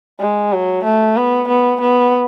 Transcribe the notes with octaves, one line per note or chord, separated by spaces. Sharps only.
G#3
F#3
A3
B3
B3
B3